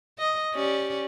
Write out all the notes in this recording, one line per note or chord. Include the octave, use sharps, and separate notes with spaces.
D#5
C#4 G4 D5